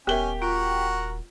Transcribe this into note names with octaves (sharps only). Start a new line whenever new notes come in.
D#1 B3 C#4 G4 A#4 E5 G#5 G7
F4 F#4 A#4 F#5